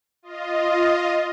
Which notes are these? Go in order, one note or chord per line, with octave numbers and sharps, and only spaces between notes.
F4 D#5